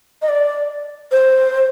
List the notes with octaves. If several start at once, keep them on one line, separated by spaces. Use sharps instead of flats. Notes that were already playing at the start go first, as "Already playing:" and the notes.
D#5
D5
C5